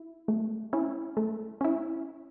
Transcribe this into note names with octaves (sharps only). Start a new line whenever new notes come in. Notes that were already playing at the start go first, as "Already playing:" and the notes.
Already playing: E4
A3
C#4 E4
A3
C#4 E4